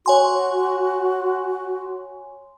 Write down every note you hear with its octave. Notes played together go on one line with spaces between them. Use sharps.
F#4 C#5 G#5 C6